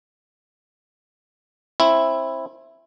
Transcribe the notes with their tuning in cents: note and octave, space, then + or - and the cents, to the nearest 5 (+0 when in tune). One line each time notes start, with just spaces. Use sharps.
C4 +25 E4 +0